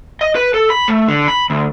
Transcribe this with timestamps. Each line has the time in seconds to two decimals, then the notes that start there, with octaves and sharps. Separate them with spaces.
0.21 D#5
0.35 B4
0.54 A4
0.70 B5
0.88 A3
1.08 D3
1.28 B5
1.50 D2